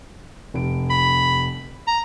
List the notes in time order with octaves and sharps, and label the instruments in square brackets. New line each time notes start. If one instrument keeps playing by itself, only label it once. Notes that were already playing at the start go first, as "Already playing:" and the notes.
[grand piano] F1 D7
[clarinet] B5
A#5